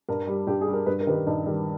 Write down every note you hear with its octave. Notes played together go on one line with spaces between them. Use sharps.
G2 A#4
G3
G2 G4
G#4
G3
A#4
G2 B4
A#4
D#3 G3 B4
A#4
G2 D#4
D#3 G3